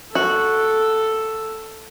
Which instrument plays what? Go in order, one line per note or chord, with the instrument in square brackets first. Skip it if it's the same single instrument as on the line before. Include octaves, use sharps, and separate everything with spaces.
[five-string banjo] F#4 [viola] A4